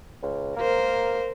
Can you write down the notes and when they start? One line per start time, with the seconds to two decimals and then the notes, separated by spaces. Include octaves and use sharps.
0.23 C#2
0.56 A#3 A#4 C5